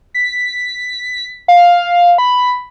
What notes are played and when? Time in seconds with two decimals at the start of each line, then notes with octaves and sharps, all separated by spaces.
0.14 B6
1.48 F5
2.18 B5